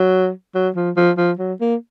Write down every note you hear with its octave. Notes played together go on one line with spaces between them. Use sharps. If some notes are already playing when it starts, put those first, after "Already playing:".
Already playing: F#3
F#3
F3
F3
F3
F#3
A#3